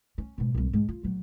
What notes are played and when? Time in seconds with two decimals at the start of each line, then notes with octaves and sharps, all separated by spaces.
0.18 C#4
0.38 G#2 B2
0.55 C2 G2
0.73 G#2
0.89 F4
1.03 A#1 F#3